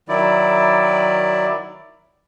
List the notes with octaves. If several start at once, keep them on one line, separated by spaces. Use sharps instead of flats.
D#3 F#3 E4 D5